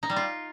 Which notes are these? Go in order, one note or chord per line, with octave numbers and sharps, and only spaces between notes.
D#4
G3
F4